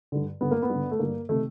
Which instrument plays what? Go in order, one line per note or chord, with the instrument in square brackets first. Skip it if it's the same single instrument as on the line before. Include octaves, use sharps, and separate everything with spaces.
[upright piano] G2 D3
G2 D3 B3
A#3
B3
G2 D3
A3
G2 D3 A#3
C3 D#3 A3